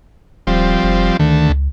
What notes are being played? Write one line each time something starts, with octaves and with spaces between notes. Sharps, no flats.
D#1 F3 G3 C4
F1
D2 D#3 A3
C#2